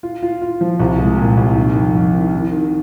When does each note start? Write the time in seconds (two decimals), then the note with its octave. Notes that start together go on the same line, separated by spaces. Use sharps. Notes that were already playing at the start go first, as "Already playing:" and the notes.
0.03 F4
0.23 F4
0.42 F4
0.61 F3
0.79 C2
0.99 G#3
1.18 A#2
1.37 C2
1.57 D#3
1.75 F2
1.95 F2
2.14 D#3
2.33 D#3
2.52 D#3